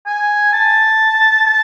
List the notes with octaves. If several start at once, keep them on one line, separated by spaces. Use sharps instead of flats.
G#5
A5
A5